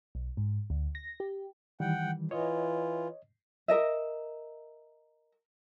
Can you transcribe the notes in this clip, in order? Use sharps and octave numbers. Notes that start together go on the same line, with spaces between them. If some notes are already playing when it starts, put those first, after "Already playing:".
B1
G#2
D2
A#6
G4
D#3 E3 G3 F#5 G5
E3 F4 C#5 D#5
A#4 D#5 E5